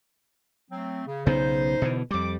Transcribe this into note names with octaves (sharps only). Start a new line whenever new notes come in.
F#3 A3 C4
C#3
B1 C#3 B3 D#4 C5
B2 D3 E3
F2 G3 D6